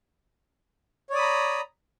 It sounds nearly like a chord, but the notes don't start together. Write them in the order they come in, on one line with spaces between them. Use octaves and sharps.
C#5 D5 D#6 B5 A#5